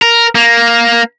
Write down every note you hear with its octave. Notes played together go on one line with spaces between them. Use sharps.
A#4
A#3